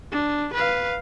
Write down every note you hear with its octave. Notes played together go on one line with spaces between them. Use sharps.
D4
B4 F5